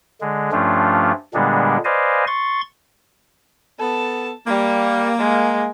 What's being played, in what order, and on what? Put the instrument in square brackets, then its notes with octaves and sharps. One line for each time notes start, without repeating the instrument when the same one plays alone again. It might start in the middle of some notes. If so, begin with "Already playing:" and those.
[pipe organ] D3 G#3
G2 F3 A3 C#4 D4 F4
A#2 D3 G3 G#3 B3 D4
B4 C5 D5 D#5 F5 G#5
C6 C#6 A6
[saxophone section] B3 A4 [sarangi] A5
[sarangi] G3 [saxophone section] A#3
[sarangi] G#3